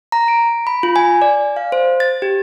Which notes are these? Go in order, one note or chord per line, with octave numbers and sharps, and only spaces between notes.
A#5
D7
B5
F4
G#5
D5
F5
C5
A6
G4